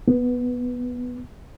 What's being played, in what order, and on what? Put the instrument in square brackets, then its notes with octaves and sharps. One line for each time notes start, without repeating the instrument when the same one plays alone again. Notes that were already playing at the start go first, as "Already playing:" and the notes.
[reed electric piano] B3